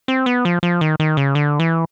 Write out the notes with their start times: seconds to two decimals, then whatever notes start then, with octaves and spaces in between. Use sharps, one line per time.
0.08 C4
0.26 B3
0.45 F3
0.63 F3
0.81 D#3
1.00 D#3
1.17 C#3
1.35 D3
1.60 E3